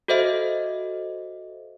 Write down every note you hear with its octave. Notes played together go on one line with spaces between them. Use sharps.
F#4 A4 C5 D#5 E5